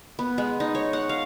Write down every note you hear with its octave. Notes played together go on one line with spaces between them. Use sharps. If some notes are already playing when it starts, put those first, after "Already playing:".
B3
G#3
D#4
C#5
F#5
F5